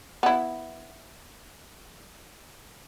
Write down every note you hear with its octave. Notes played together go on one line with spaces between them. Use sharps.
B3 E4